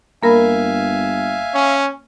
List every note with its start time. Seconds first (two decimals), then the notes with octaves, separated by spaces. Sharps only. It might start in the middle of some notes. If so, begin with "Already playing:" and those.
0.23 G1 A#3 A#4 E5 F5 G#5 B5
1.55 C#4